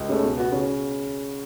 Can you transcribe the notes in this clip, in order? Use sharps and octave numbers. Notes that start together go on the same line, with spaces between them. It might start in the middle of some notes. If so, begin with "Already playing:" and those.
Already playing: C#2
C#3 A3
B2
B3 F#4
C#3